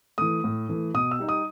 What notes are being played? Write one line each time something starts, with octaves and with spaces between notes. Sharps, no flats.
E3 A3 D#6
A2
E3 A3
B2 D#6
E6
G3 D#4
D#6